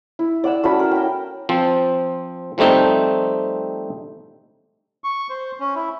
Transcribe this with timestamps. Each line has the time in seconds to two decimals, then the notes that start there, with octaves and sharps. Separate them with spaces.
0.19 E4
0.44 D5 F#5 E6
0.64 A3 C#4 F#4 B5
0.79 A#4
0.91 G5 A#5
1.49 F3 C4
2.58 F3 G3 A3 C4 D#4
5.04 C#6
5.30 C5
5.60 C#4
5.76 E4